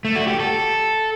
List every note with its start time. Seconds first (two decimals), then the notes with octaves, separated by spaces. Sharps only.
0.05 A3
0.16 F#4
0.27 G4
0.40 A4